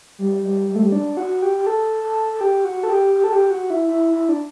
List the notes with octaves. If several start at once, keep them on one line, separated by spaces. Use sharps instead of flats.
G3
G3
G3
A3
G3
D4
F#4
G4
G4
A4
A4
A4
G4
F#4
A4
G4
G4
A4
G4
F#4
E4
E4
E4
D4